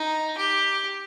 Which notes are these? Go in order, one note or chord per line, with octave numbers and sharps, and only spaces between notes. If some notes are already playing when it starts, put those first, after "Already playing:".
Already playing: D#4
G4